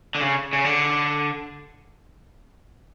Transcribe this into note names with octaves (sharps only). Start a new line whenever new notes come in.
D3
C#3
C#3
D3